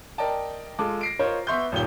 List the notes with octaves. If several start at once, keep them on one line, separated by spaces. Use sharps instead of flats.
A#4 D5 D#5 G5 A5
G#3 F4 A4 A5 D6
A#6 C7 D7
F4 A#4 C5 C#5 D#5 A#5
B3 E5 C6 C#6 G6
D#1 D#2 A#2 G4 G7